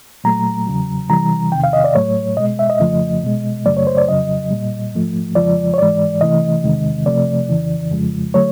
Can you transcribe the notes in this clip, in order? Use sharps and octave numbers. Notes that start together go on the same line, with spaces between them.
A#2 F#3 A3 A#5
E2 C#3 F#3
C3 E3 G3 A#5
E2 C3 D#3 G5
F5
D#5
D5
A2 F#3 A3 C#5
B2 G#3 D#5
E5
D#5
F2 C#3 F3 A3
B2 G#3
F#2 C#3 F#3 A3 D5
C#5
C5
D5
F2 C#3 F#3 D#5
A#2 G3
G#2 F3 A3
F2 C#3 F3 G#3 D5
C#5
G#2 E3 G#3 D5
C3 E3 A3 D#5
E2 C3 D#3 G#3
C3 F3 A3 D5
F2 C#3 E3
F2 C#3 F3 G#3
D3 F#3 A3 C#5